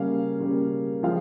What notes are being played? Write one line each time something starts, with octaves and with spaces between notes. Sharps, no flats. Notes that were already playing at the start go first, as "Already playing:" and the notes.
Already playing: C#3 G3 A#3 C#4 F5
C#3 G3 A#3 C#4
F3 G#3 F5